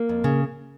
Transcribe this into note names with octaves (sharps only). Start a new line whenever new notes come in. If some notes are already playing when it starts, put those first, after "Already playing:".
Already playing: A#3
F2
C#3